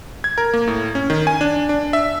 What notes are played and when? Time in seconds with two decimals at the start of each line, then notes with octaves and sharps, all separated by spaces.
0.24 G#6
0.38 A#4
0.54 A#3
0.67 A2
0.95 C#4
1.10 D#3
1.27 G#5
1.41 D4
1.69 D4
1.93 E5